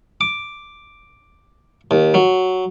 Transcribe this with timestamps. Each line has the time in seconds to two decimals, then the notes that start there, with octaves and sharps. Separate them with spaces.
0.21 D6
1.91 D#2
2.14 F#3